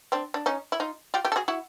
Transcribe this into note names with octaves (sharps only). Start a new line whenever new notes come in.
C4 D4
D4
C#4 D#4
E4
D#4 F4
F4 G4
F4 G4
A4
F#4 G#4
E4 F#4